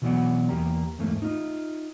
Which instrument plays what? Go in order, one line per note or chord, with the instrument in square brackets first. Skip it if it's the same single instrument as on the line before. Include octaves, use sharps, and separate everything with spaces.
[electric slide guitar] B2 E3 F#3 B3 D5 F#5
E2 A#3 G4 A#5
E2 G#2 A3 A#3
D#4 F4